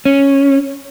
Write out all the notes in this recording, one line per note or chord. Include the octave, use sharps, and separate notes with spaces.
C#4